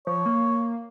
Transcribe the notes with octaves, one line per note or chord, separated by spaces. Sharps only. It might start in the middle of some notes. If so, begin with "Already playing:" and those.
F3 C#5
A#3